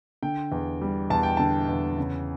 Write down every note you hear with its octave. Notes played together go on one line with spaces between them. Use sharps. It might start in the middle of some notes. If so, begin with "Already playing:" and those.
D3 G5
E2
G3
E2 A5
G5
D3 A5
E2
C#3